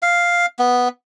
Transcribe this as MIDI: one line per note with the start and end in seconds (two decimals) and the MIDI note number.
0.02 0.46 77
0.59 0.88 59